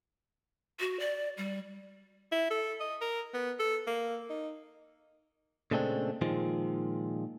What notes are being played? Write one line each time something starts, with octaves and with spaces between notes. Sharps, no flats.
F#4
D5
G3
E4
A4
D#5
A#4
B3
A4
A#3
D#4
A#2 C#3 G#3 A3 C4 D4
A#2 D#3 F3 G#3